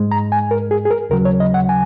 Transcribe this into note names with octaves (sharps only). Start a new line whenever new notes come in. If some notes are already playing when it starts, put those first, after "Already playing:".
Already playing: G#2 G#3
A#5
G#5
A#4
G#4
G#4
A#4
D#2 C#3 F#3 A#4
C#5
D#5
F#5
G#5